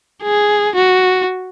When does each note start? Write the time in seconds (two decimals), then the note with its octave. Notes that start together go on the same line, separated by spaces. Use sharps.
0.23 G#4
0.75 F#4